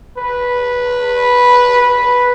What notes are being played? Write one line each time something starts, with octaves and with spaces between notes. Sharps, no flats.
B4
B4